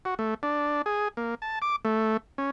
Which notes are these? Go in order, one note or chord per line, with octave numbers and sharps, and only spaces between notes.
F#4
A3
D4
G#4
A#3
A5
D6
A3
C#4